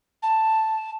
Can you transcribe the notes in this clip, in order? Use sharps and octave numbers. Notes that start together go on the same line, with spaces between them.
A5